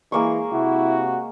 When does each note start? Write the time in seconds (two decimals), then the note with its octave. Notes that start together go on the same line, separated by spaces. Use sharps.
0.12 E3 G#3 A#3 C#6
0.52 C3 E4 F#4